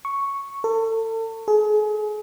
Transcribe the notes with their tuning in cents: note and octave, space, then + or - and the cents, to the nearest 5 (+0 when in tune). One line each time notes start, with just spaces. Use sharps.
C#6 +0
A4 +35
G#4 +35